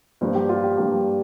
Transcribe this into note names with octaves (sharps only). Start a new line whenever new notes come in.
G2 F3 A#3 D4 C5
G4
F4
G4
G2 F3 A#3 D4 G4